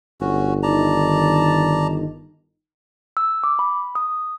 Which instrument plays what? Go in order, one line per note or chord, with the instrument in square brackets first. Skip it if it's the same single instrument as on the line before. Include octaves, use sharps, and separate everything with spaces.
[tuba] G1 [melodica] C#4 F#4
[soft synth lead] D#3 [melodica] D5 A5 A#5
[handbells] E6
D6
B5
D#6